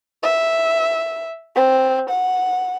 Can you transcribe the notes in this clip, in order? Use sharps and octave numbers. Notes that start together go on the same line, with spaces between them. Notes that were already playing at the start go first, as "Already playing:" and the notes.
E5
C4
F#5